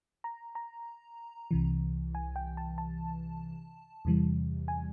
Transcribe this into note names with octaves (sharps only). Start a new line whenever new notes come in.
A#5
A#5
C2 C3 E3
G#5
G5
A5
A5
E2 C3 E3 G3
G#5